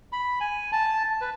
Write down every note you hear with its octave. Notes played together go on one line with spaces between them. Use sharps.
B5
G#5
A5
B4